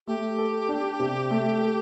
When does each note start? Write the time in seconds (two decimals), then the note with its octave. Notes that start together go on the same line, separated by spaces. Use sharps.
0.07 A3 G4
0.38 A4
0.69 D4
1.00 C3
1.31 A3
1.61 A4